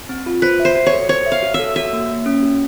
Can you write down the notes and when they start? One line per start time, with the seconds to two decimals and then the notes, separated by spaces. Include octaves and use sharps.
0.09 C4
0.26 F4
0.42 B4 C5
0.60 E5
0.65 C5
0.75 F#4
0.86 C#5
0.93 A4
1.09 C5 C#5
1.26 E5
1.32 F5
1.43 F#4
1.54 E5
1.59 A4
1.76 F#4 E5
1.93 A#3
2.10 A#3
2.26 C#4
2.43 F#4